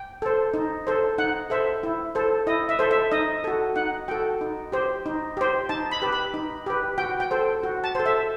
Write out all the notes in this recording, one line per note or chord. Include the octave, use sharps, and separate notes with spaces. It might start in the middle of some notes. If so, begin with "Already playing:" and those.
Already playing: G5
A4 C5
D#4
A4 C5
D#4 F#5
A4 C5 E5
E4
A4 C5
E4 D#5
E5
A4 C5
E5
D#4 D#5
F#4 A4
D#4 F#5
F#4 A4 G5
D#4
G4 C5
D#4
G4 C5
D#4 A5
B5
G4 B4
B5
D#4
G4 B4
F#4 G5
G5
A4 C5
F#4
A5
A4 C5
E5